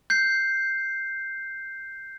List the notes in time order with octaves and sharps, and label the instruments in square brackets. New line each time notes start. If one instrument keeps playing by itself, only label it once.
[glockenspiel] G6 C7